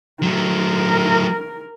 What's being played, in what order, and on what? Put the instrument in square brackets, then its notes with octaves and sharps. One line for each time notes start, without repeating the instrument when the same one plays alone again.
[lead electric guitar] F#3 A3 [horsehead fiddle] A#4